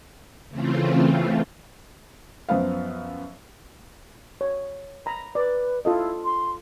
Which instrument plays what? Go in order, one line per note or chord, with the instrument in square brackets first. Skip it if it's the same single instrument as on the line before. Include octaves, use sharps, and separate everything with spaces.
[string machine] C#3 E3 A3 C4 F4
[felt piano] F#2 F3 B3 F5
[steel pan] C#5
A#5 B5
[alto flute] B4 [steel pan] D5
[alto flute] E4 [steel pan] F4 A4 D#5
[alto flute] C6